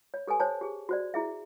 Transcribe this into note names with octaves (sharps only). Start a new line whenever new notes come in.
C#5
G4 A4 B4 G#5
C5 C#5 A5
G4 G#4
F#4 C5 D5
E4 G#4 E5